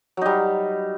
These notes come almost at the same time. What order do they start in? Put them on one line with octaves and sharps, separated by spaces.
F#3 D#4 G3